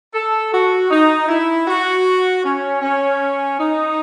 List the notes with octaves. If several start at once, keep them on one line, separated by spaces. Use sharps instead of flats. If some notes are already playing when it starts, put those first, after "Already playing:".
A4
F#4
D#4
E4
F#4
C#4
C#4
D#4